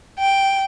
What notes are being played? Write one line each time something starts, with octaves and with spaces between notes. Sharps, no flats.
G5